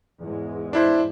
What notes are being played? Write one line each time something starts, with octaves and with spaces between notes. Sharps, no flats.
E2 G#2 G#3
D4 E4 C5